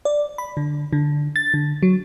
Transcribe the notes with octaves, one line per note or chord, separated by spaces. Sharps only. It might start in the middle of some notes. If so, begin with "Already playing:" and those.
D5
B5
D3
D3
A6
D3
F#3